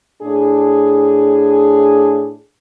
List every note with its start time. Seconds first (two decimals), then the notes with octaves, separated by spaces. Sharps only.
0.22 A2 D4 G#4